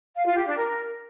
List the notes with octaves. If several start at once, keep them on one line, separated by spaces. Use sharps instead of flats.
F5
F4
G4
D4
A#4